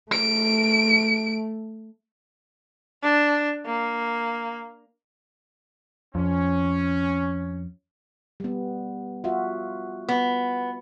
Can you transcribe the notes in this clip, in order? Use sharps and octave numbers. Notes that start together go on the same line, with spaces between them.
A3 D7
D4
A#3
F2 C#4
G3 B3
F4 F#4 E5
B3